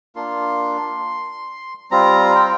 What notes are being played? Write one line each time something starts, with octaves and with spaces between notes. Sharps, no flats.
A#3 D4 F4 C6
G3 C4 F4 A#5
G5